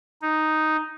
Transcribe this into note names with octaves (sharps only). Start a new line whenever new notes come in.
D#4